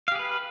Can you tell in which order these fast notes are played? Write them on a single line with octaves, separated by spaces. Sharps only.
F5 G4 G#4 B4